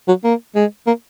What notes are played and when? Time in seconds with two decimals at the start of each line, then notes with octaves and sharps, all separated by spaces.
0.08 F#3
0.24 A#3
0.56 G#3
0.87 A#3